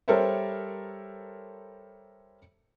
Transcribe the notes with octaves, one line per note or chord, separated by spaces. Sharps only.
G3 A4 A#4 C5 C#5 E5